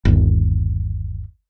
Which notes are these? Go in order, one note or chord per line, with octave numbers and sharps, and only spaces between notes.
G1 D#2